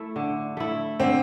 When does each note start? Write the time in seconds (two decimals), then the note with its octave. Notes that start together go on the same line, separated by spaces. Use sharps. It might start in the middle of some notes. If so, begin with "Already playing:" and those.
Already playing: A3 E4
0.16 D3
0.57 A3 E4
1.00 D3 C4